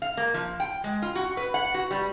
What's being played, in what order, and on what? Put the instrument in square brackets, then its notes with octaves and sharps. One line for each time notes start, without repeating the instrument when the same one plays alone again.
[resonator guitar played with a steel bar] F5
A#3
F3
G5
G#3
F4
F#4
B4
F#5
F#4
G3